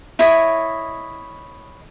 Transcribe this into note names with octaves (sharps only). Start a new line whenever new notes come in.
E4 C#5 D#5